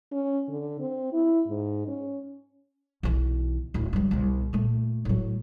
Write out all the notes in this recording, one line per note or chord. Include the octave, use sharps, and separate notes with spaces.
C#4
D3
C4
E4
G#2
C#4
B1 E3
D1 E4
G2 F#3
C2 B2
A#2 A3
A2 F#3